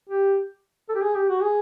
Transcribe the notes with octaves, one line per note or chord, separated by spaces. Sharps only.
G4
A4
G4
G#4
G4
F#4
G#4